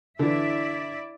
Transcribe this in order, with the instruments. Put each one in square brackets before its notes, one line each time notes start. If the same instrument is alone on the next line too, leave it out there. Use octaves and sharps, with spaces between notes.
[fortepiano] D3 E3 [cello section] E4 D5 E5